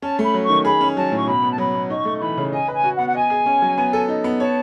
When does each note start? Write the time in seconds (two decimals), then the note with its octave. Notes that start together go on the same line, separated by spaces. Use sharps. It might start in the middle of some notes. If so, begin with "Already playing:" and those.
0.02 C#4 A5
0.19 A3 B5
0.34 F#3
0.44 C#6
0.49 D#3
0.65 G#4 B5
0.81 C#4
0.96 F#3 A5
1.11 A2 C#6
1.27 B2 B5
1.43 B3
1.50 A5
1.58 F#3 B5
1.74 B2
1.90 D#4 C#6
2.05 A3
2.17 C#6
2.21 E3 B5
2.37 C#3
2.52 D#5 G#5
2.68 B4 G#5
2.84 F#4
2.94 F#5
2.99 B3
3.07 F#5
3.15 D#5 G#5
3.30 G#4
3.46 C#4
3.62 F#3
3.78 B3
3.93 A4
4.09 D#4
4.24 B3
4.40 C#5 A5